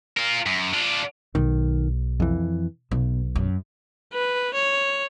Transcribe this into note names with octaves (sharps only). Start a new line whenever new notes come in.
F4 A#4
F#2
D4 F4
B1 D#3
F2 E3
B1 B2
F#2
B4
C#5